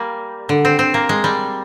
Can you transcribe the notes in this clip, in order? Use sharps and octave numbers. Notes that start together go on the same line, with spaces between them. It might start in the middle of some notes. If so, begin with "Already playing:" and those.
Already playing: G3 A#3
D3
C4
C4
A#3
G#3
G3